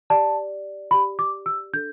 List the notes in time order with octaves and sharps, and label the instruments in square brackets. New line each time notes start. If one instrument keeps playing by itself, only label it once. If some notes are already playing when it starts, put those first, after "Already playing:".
[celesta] G4 D5 A5
G4 D5 B5
D6
E6
D4 A4 G6